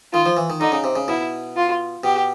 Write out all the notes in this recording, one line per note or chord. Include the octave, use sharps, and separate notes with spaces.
D#3 F4
F3
E3
D#3
D3 D#4
C#3
C3
C#3
B2 E4
F4
B2 G4